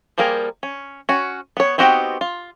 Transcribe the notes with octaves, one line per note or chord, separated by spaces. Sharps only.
F3 G3 A#3 G#4 A#4
C#4
C#4 F#4
B3 C#5
B3 C4 D#4 F#4 G4
F4